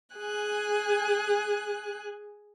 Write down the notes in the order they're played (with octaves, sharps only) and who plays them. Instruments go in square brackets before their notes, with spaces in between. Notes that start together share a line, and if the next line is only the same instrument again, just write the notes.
[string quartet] G#4 G#5 F#6